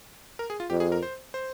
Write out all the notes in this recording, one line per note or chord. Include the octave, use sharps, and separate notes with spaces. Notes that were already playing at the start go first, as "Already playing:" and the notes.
A#4
G#4
F4
F2 G4
G#4
A#4
C5
C5